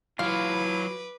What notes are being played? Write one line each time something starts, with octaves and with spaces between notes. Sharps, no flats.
F#3 E4 F4 B4 F5 D6